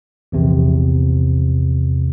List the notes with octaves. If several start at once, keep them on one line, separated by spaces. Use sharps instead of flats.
A#1 E2 C3